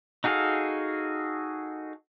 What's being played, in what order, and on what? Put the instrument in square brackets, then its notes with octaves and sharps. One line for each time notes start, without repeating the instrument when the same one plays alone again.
[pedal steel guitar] D#4 F#4 G#4 A4 F5